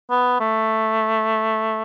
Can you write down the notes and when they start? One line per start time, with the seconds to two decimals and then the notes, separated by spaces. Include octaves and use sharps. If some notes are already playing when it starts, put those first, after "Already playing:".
0.11 B3
0.40 A3